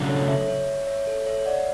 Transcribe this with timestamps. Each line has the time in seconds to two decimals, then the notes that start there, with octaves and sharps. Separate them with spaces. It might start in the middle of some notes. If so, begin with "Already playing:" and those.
Already playing: C#3 F#3 A3 D4 F#4
0.09 A4 C#5
0.28 C#5 E5
0.48 C#5 E5
0.87 C#5 E5
1.07 A4 C#5
1.26 C#5 E5
1.46 D5 F#5